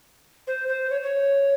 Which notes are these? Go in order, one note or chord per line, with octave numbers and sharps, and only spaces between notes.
C5
C5
C#5
C#5